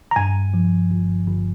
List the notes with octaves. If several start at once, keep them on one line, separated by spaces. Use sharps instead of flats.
A#5
G2 G#5
F3
G1
G1